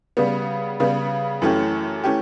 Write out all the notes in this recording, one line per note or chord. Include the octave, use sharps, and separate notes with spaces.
C#3 G3 B3
C#3 G3 B3
F#2 E3 A3 C#4 G4
E3 A3 C#4 G4